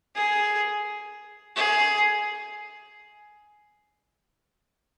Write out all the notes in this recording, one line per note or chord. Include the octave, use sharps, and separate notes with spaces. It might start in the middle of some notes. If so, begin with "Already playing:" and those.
G#4
G#4